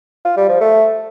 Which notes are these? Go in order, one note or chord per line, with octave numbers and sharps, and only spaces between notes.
F4
G3
F3
A3